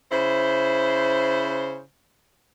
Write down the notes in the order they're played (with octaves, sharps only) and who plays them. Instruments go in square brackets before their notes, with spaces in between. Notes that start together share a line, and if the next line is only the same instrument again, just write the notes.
[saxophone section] C#3 E4 C5